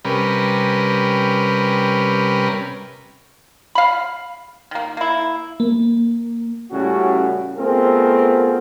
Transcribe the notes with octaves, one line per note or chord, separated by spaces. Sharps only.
C3 G3 C#4 A#4 B4
F5 B5
D#3 A#3
A#3 E4
A#3
A2 C#3 G3 C#4 F#4
A3 B3 C4 F4 G#4 A#4